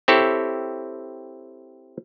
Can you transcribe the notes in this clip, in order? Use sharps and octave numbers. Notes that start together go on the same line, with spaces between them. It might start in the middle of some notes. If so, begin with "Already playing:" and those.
C4 E4 G4 A4 C#5